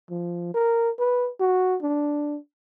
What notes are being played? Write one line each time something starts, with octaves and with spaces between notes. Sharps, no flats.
F3
A#4
B4
F#4
D4